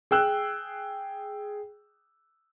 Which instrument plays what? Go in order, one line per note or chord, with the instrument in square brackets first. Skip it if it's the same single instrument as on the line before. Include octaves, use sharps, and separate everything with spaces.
[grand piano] G#4 G5 E6 F#6